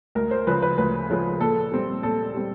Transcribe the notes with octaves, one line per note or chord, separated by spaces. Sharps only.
D2 A#4
C5
C#3 F3 G#3 B4
B4
D2 B4
C#3 F3 G#3
A#2 A4
G3 C4
A#2 A4
G3 C4